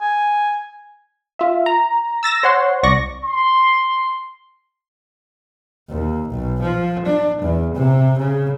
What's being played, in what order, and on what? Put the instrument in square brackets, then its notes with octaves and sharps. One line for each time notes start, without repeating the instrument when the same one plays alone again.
[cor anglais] G#5
[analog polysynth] F4 E5
A#5
E6 A6 A#6 E7
C5 C#5 F#5 C6
C2 D5 C#6 A#6
[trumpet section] C6
[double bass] D#2
B1
F3
D4
E2
C3
C#3